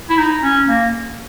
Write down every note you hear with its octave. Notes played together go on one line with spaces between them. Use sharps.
E4
D#4
C#4
A#3